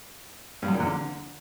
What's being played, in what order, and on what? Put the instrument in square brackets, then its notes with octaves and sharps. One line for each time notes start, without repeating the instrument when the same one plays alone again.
[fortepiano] G2
F#2
A#2
E2
D3